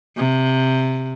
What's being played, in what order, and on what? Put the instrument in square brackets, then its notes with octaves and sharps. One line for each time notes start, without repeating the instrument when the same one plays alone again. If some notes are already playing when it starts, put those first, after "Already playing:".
[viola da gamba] C3